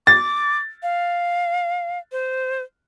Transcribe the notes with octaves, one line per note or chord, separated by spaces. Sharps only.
D6 A6
F5
C5